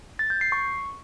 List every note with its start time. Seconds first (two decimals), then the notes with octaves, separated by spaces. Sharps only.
0.19 A6
0.30 G6
0.41 C7
0.52 C#6